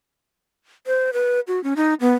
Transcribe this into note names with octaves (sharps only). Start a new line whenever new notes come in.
C5
B4
F#4
C#4
D#4
B3